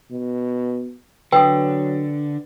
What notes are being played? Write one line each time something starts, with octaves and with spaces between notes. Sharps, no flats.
B2
D3 F#3 B4 G5 D#6